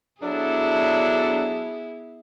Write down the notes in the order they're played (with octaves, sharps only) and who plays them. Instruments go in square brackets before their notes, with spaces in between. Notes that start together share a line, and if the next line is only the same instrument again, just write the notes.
[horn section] F#3 D4 A4 [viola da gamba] B3 E4 G#4